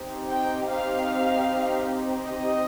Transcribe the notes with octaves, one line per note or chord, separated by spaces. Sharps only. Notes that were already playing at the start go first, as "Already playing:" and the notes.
Already playing: C4 D#4 G4
G5
F5
D#5